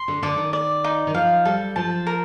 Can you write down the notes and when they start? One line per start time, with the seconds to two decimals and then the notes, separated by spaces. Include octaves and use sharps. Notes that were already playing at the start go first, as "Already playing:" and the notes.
Already playing: C6
0.08 D3
0.23 D3 D5
0.38 D#3
0.53 D5
0.84 D#4
1.07 D#3
1.14 F3 F5
1.45 G3 A4
1.76 F3 A5
2.07 A#4